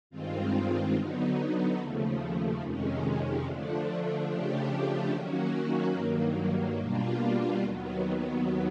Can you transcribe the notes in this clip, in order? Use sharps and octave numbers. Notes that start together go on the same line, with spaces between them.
G2 D#3 G#3 C4 F4
D3 F#3 B3 D#4
D#2 C#3 F3 A3
F2 C3 D#3 G#3 C#4
D3 F3 A3 D4
C#3 F3 A3 D4 G4
D#3 F#3 A#3 C#4 F#4
G2 D#3 F#3 A#3
B2 G3 A#3 D4 F4
D#2 D#3 F#3 B3